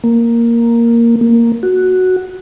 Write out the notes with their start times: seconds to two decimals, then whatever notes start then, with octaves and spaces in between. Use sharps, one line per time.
0.04 A#3
1.21 A#3
1.63 F#4